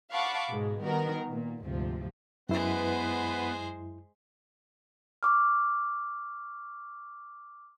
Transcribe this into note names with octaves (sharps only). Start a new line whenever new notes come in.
F5 F#5 A5 B5 C#6 D6
G#2 B2 G#3
D#3 G3 B3 F#4 A#4
A#2
D2 G#2 C3 F3
F#2 G#3 B3 E4 B4 C5
C#6 D6 F6